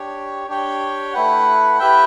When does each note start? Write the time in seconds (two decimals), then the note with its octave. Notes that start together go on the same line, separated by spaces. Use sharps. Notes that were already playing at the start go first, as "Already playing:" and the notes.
Already playing: D4 G4 C#5
0.48 D4 G4 C#5 G5
1.13 A3 E4 B4 F#5
1.79 E4 G4 B4 E5 G5